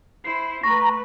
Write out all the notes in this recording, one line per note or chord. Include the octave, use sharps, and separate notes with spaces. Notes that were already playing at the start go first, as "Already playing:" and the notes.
E4 C5 C7
A3 B4 A#5 C#6